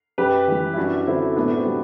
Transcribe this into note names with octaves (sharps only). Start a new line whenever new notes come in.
F#2 G4 B4
E3 G3
E4
F#2 D4 F#4
D3 F#3 C4 E4
A2 B3 D4
F#4
C4 E4
G3